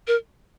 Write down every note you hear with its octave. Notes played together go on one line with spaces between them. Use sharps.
A#4